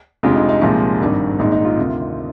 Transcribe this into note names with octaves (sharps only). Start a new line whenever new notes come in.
F1 F2 D3 G#3 F4
D#4
D#4
C2 A#2 F3 G#3 D#4
G#1 G2 D#3 G3
A#1 G#2 D#3 D#4
D#4
F4
D2 C3 D#3